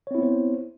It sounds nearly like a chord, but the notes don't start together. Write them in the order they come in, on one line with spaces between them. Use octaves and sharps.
C#5 C4 E4 B3 C5